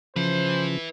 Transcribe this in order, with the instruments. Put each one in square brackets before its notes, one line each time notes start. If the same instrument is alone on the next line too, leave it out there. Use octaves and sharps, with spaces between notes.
[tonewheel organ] C#3 [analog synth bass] F3 [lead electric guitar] E4 B4 [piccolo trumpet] C5